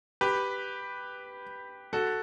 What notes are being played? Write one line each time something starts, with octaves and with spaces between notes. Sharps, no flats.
G4 B4
F#4 A4